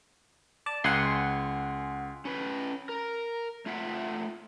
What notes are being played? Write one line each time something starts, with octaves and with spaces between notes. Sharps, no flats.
D5 A5
C#2 F#5 G#5 C6
C#4 B4
A#4
A3 F4 E5 F#5